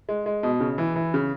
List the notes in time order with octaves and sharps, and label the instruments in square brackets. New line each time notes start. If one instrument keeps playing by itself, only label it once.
[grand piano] G#3
G#3
B2
C#3
E3
E3
C#3